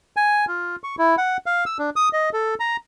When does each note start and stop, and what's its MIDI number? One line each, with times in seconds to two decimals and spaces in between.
0.17 0.45 80
0.48 0.76 65
0.84 0.96 85
0.99 1.16 64
1.18 1.37 78
1.46 1.64 77
1.66 1.77 88
1.79 1.90 62
1.96 2.09 87
2.13 2.30 75
2.33 2.55 69
2.60 2.77 82